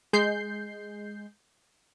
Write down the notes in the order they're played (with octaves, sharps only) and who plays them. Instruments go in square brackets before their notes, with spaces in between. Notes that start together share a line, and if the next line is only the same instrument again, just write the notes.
[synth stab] G#3 G6 C7